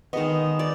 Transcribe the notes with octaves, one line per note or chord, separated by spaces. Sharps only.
D#3 G#3 B3 D#5
D5